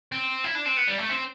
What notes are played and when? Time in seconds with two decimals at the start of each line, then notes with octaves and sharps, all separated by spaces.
0.12 C4
0.44 E4
0.55 D4
0.66 C4
0.77 B3
0.88 G3
0.98 A3
1.10 C4